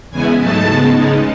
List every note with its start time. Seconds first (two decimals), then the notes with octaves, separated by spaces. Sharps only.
0.10 E2 C#3 G#3 B3 E4 G#5
0.38 G#2 F#3 A3 D#4 A5
0.67 C#3 G#3 B3
0.95 C#3 G#3 D#4